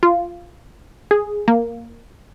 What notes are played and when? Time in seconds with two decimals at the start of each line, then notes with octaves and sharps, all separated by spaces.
0.03 F4
1.11 G#4
1.48 A#3